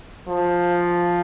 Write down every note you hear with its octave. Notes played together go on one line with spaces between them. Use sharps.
F3